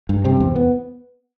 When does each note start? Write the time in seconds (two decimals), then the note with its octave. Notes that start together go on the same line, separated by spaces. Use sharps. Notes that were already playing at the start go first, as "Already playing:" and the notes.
0.09 G2
0.24 C3 C4
0.40 E2
0.56 B3